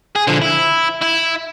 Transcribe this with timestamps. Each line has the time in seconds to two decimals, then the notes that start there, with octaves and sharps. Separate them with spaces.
0.16 G#4
0.27 D3 F3
0.42 E4
1.02 E4